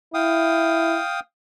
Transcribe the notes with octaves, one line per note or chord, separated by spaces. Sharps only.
E4 F5 G5 D#6